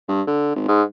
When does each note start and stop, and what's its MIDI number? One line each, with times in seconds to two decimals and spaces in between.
0.08 0.22 43
0.27 0.54 50
0.56 0.64 32
0.68 0.83 44